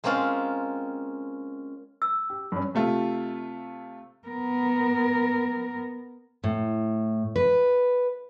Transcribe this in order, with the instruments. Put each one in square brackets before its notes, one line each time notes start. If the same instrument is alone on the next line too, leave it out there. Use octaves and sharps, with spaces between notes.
[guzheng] G#3 A#3 C4 C#4 F4
[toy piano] E6
[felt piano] G4
G2 C#4
[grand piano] C3 A3 F4
[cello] B3 A#4
[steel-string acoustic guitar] A2
B4